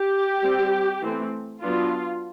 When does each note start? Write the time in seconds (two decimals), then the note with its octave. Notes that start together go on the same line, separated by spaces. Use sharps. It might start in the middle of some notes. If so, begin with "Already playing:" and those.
Already playing: G4
0.43 G3 C4
1.02 E3 A3 C4
1.62 F#3 B3 D4 F4